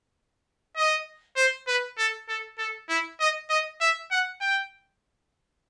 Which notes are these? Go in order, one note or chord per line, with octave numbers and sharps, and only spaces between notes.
D#5
C5
B4
A4
A4
A4
E4
D#5
D#5
E5
F#5
G5